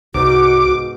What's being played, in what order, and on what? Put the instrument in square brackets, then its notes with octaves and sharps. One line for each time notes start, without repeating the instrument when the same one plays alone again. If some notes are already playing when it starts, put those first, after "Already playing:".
[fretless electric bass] C2 [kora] G#2 B2 D#4 [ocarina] F#4 [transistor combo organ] D6